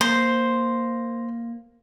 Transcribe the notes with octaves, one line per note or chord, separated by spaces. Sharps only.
A#3 C5